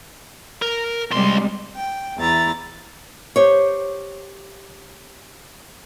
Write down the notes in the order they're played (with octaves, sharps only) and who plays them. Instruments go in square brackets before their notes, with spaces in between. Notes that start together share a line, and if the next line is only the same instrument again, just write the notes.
[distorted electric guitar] A#4
[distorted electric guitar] C#2 C6 [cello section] C3 G3 G#3
[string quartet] G5
E2 E4 A#5 A6
[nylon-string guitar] G4 C5 C#5